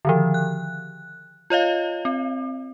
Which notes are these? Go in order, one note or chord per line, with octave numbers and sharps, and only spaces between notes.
D3 D#3 F3
F#6
F4 C#5 D#5 F5
C4